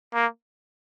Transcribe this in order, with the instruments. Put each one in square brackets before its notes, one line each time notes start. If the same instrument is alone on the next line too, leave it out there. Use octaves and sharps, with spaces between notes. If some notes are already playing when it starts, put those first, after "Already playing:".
[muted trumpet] A#3